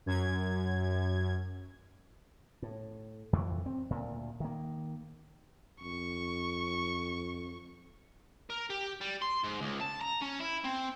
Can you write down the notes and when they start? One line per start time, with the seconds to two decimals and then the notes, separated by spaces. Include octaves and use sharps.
0.06 F#2 G#6
2.62 A2
3.33 F2 E3
3.66 C4
3.91 D2 A#2
4.40 D#3 A#3
5.81 F2 C#6
8.50 A#4
8.70 G4
9.01 G3
9.22 C6
9.44 G#2
9.62 C#2
9.81 A5
10.01 A#5
10.22 C#4
10.41 E4
10.65 C4